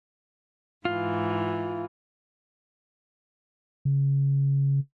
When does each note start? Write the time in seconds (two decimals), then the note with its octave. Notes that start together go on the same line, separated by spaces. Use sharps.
0.85 G#2 E3 F4
3.85 C#3